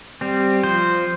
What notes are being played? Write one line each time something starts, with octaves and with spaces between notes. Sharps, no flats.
G3 C4
F3 C5